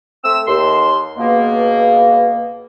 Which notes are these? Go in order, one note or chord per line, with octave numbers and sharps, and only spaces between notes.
A3 C4 E6
D#2 C6
C#2 B2 A#3